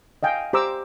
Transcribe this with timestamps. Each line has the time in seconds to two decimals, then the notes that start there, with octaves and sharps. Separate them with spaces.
0.23 D#5 F5 G5 G#5
0.53 G4 C5 A#5 D6 E6